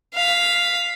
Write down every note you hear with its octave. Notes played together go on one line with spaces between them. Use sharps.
F5 B6